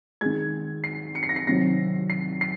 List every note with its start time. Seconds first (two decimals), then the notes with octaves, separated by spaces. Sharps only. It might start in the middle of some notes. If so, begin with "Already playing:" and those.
0.21 D#3 G#3 G#6
0.84 C7
1.15 C#7
1.23 C7
1.29 A#6
1.36 C7
1.47 C3 D#3 F#3 A#6
2.10 C7
2.41 C7